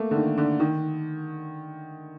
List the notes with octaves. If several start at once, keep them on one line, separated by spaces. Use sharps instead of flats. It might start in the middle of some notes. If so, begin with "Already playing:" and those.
Already playing: A3 A#3
D3
D#3
D3
D#3